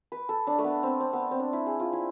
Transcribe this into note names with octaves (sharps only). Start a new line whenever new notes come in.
B4
A4
D4
A3
B3
C4
C4
B3
C4
D4
E4
G#4
F4
E4